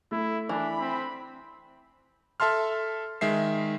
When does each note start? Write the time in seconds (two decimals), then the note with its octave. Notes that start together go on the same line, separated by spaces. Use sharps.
0.11 A3 E4
0.49 E3 D4 B5
0.79 C4
2.40 A4 E5 A5 C6 F6
3.21 D#3 G#3 E5 C7